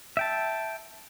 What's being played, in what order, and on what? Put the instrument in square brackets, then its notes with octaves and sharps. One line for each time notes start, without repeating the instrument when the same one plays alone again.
[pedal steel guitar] E5 G5 A5